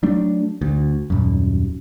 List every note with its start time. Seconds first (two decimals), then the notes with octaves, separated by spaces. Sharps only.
0.03 F#3 A3 D4
0.61 D2
1.10 D#1 F#2